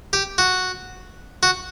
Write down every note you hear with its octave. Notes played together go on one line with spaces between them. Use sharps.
G4
F#4
F#4